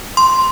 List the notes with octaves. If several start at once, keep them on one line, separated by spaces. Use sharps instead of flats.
C6